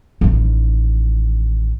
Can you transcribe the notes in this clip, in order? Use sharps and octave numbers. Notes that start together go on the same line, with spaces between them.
A1 D#3